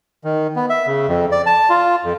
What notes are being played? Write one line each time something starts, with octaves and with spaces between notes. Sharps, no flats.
D#3
B3
E5
C#3
F2
D5
A5
F4
F2